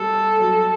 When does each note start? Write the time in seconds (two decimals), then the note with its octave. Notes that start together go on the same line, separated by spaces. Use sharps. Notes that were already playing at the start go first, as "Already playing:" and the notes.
Already playing: G3 A4
0.40 F#3